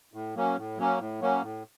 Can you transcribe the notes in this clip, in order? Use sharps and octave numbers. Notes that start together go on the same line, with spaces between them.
A2
F#3 A#3 C#4
A2
F#3 A#3 C#4
A2
F#3 A#3 C#4
A2